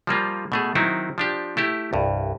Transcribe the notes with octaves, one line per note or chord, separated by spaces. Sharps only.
F3 G3 A#3 F4
B2 A3 G#4
D#3 F#3 C4 D#4 E4
F3 D4 G4
A3 E4 G4
C2 G2